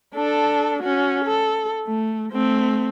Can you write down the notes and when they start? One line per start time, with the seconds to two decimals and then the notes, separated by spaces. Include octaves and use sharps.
0.14 D4 A4
0.82 C#4 F#4
1.25 A4
1.87 A3
2.32 A3 C4